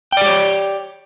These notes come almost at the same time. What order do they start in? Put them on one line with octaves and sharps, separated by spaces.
G5 D5 G4 C#5